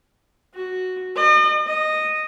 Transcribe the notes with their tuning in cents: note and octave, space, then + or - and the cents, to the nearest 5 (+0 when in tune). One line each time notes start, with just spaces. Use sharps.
F#4 +0
D#5 -40
D#5 -10